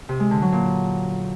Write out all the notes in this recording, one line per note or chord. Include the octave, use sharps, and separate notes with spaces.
C3
G#3
D3
F#3
A#2